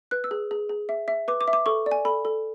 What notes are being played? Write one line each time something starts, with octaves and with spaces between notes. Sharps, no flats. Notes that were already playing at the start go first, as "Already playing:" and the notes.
B4 F#6
E6
G#4
G#4
G#4
E5
E5
B4 D6
D6
E5
D6
A4 C#6
D5
G#5
A4 B5
A4